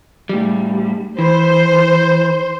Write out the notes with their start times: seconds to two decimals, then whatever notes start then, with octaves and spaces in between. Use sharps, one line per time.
0.29 A2 G3
1.19 E3 C5